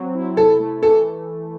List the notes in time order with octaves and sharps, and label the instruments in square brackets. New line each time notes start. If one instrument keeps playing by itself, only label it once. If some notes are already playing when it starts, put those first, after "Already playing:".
Already playing: [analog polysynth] F#3 C4
E4
[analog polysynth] C3 [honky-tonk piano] A4
[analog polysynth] A3
[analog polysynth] E3 [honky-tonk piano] A4